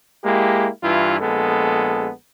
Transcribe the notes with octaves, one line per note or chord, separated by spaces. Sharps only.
G#3 A#3 E4 G4
G2 E3 E4 F4
A#1 G#3 B3 A4